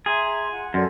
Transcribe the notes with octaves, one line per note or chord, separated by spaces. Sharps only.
G#4 E5 A#5 C6
F4 F#5
F#2 A4 D5 C6